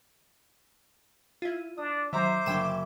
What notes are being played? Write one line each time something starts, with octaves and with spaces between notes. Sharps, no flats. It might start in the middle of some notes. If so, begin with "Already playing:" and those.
E4 F4 D#7
D4 D#6
D#3 F#3 C5 E5 A#5 D6
F#1 D3 G5 G#5 B5 E7